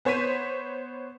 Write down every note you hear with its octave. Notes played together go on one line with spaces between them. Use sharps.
B3 C5 C#5 B6 D#7